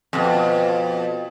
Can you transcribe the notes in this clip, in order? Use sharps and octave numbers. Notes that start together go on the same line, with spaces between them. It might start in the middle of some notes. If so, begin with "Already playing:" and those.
F2 B2